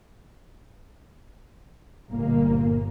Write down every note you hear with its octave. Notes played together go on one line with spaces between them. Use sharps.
G1 A#2 A#3